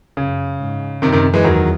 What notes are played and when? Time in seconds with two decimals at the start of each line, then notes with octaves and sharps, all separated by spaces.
0.17 F#2 C#3
0.60 G#2
1.02 F#2 C3 D#3
1.12 C3 D#3
1.34 E3 G#3
1.44 E2 D#3 F#3